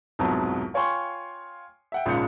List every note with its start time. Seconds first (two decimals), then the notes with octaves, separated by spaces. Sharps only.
0.19 C2 F2 G#2 B2 F#3
0.74 F4 C#5 G5 G#5 C6 C#6
1.92 E5 F#5 G5
2.06 A#1 G#2 C#3 F4 G6 C#7